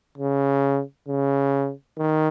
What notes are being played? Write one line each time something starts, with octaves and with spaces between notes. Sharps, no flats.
C#3
C#3
D#3